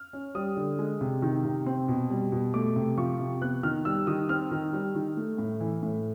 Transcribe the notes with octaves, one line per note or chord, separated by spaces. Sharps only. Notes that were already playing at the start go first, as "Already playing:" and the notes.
Already playing: F6
C#4
G3 D#6
D3
G#3
C3
D#3
C3
C4
B2
G3
B2
A3 D6
C3
F3 C#6
C3
B3 F#6
D#3 F6
G3 E6
D#3 D#6
C4 F6
D#3
G3
D#3
A3
A2
E3
A2